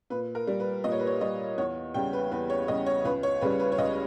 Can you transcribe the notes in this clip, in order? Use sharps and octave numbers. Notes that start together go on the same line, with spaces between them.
A#2 B4
A#4
G3
B4
A#2 D#5
C#5
B4
C#5
G3 D#5
E2 C#5
C#3 G3 G5
B4
E2 B4
C#5
C#3 G3 D#5
C#5
C#2 B4
C#5
C#3 G3 B4
B4
C#5
C#2 D#5